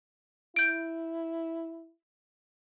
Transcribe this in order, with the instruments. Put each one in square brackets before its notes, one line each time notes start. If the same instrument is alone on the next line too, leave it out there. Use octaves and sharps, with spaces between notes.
[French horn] E4 [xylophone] G6 D7